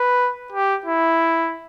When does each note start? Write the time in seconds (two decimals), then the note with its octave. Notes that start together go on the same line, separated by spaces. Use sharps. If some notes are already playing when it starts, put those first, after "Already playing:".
Already playing: B4
0.52 G4
0.86 E4